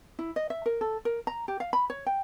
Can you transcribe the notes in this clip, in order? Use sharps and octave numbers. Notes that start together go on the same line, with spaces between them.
E4
D#5
E5
A#4
A4
A#4
A#5
G4
F5
B5
C#5
G5